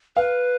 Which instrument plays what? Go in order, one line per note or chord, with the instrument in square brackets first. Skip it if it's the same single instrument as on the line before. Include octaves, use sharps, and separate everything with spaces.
[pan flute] B4 [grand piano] F5